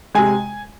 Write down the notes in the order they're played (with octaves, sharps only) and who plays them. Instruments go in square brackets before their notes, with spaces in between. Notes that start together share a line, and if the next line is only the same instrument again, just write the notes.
[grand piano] C3 G#3 G#5